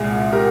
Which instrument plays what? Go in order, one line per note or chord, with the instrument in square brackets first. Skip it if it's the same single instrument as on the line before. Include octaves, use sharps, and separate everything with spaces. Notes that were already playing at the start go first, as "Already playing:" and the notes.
Already playing: [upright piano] C2 A#2 G#3 [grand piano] G#4
[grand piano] G4 A#4